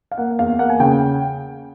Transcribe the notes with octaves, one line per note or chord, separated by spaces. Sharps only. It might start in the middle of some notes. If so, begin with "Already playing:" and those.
F5
A#3 F#5
E2 F5
A#3 F#5
G#5
C#3 G5